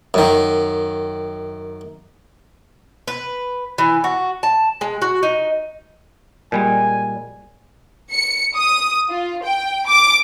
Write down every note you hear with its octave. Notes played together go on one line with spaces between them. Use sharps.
F#2 D#3
B4
E3
F#4
A5
G#3
F#4
D#4
A#2 G3 G#3 G#5
C#7
D#6
F4
G5
D6